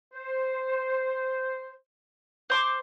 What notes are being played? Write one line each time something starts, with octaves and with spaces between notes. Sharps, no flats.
C5
C5 C6 D6